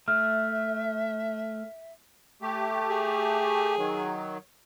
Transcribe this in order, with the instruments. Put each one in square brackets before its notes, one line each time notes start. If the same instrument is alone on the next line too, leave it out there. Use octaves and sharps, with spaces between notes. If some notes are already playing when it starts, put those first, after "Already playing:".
[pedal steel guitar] A3 [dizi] E5 [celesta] F6
[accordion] A3 G4
[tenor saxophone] G#4
[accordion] D#3 F#3